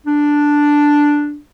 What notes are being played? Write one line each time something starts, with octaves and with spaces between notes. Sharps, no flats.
D4